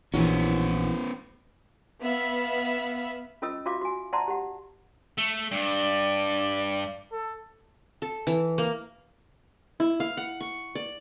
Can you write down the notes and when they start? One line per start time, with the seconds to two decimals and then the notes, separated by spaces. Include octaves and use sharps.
0.14 A#1 E3 B3 C#4 E4 F#4
2.02 B3 E5 F5 B5
3.42 C#4 F4 A4 D#5 D#6 E6
3.66 F4 F#4 E5 F5 D6
3.81 F#4 G#5
4.13 D5 E5 F#5 A5 A#5 C6
4.28 G4 F#5
5.18 A3
5.52 G2 D5
7.11 A4
8.02 A4
8.27 E3
8.58 A#3
9.80 E4
10.00 F5
10.17 F#5
10.41 C#6
10.75 D5